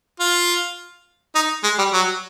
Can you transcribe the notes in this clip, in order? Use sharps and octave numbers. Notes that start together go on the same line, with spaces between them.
F4
D#4
G#3
G3
F#3